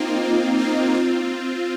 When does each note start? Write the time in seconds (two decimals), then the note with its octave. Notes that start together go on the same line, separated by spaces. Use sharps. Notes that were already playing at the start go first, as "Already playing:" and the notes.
Already playing: A#3 C4 D#4 F4
0.25 A#3
0.59 A#3 D#4
0.94 C4 F4